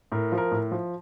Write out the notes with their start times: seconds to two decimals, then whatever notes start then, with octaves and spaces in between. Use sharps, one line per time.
0.12 A2 A#4
0.32 F3
0.38 A#4
0.51 A2
0.72 F3